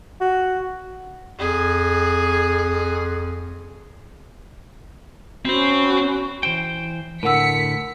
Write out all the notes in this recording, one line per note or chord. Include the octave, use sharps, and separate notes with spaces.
F#4
F2 G#4
C4 C#4 F#4 C5 B5
E3 C5 G5
A2 D3 A#4 F#5 E6 B6 C#7